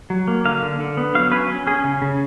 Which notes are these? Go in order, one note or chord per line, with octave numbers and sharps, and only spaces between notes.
F#3
A#3
D3 F5
D3
D3
B3
F#3 F5
C#4 B4
C#4
C#4 G#4
C#3
C#3